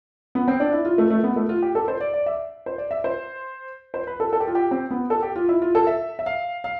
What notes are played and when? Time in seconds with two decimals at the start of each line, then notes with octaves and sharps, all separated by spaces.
0.35 B3
0.48 C4
0.60 D4
0.73 E4
0.85 F4
0.98 A3
1.10 A3
1.24 B3
1.36 A3
1.49 F4
1.62 G4
1.75 A4
1.88 C5
2.01 D5
2.14 D5
2.26 E5
2.66 C5
2.78 D5
2.91 E5
3.04 C5
3.94 C5
4.07 B4
4.20 A4
4.33 A4
4.40 G4
4.47 F4
4.55 G4
4.71 C4
4.91 B3
5.10 A4
5.22 G4
5.36 F4
5.49 E4
5.62 F4
5.75 A4
5.87 E5
6.19 E5
6.26 F5
6.64 F5